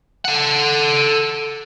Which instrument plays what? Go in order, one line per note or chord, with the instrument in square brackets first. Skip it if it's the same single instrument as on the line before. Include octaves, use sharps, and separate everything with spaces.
[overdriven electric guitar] A4 F#5